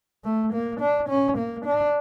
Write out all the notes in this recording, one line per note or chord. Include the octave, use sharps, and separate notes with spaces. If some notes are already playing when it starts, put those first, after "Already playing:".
A3
A#3
D4
C#4
A#3
D4